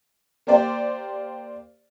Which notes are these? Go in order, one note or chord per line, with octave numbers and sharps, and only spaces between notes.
A#3 G4 A#4 C5 D5 G5